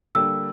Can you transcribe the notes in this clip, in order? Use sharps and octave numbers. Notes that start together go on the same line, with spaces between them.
D3 G3 A#3 E6